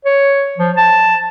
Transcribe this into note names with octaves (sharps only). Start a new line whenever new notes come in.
C#5
F3
A5